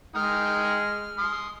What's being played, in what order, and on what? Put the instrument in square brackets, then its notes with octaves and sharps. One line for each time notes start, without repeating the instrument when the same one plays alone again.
[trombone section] G#3 [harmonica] D#4 G5 D#6 [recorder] F6
[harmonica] C6 D#6